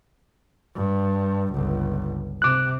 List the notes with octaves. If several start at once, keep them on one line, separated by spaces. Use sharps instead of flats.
G2
G1 C#2
C3 D6 F#6